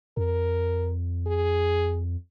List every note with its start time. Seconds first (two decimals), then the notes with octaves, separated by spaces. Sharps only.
0.17 F2 A#4
1.27 G#4